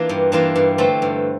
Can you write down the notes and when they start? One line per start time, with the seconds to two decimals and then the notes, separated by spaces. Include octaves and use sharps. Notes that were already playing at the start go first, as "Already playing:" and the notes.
Already playing: E3 A#3 D4 F4
0.09 G2
0.32 E3 A#3 D4 F4
0.55 G2
0.78 D3 A3 C4 F4
1.02 G2